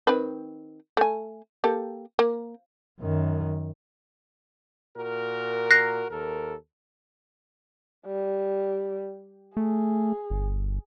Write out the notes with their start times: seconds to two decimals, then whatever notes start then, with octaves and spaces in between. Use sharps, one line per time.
0.07 D#3 C4 B4
0.97 A3 G#5
1.64 A#3 G4 A4
2.19 A#3
3.00 F#2 D#3
4.96 A#2 F#4 A#4
5.71 F#6 A#6 C7
6.10 D#2 A4 A#4
8.06 G3
9.57 A3 G#4
10.30 G1